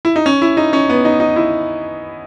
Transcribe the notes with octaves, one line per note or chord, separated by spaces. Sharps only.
E4
D#4
C#4
E4
D#4
C#4
B3
D#4
D#4
E4